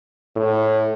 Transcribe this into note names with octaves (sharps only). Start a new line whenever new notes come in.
A2